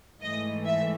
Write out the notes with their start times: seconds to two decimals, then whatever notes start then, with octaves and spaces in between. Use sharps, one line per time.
0.21 G#2 E3 A3 D#5
0.65 E5